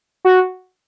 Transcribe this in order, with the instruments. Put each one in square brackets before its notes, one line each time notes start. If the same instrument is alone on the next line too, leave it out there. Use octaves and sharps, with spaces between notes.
[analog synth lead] F#4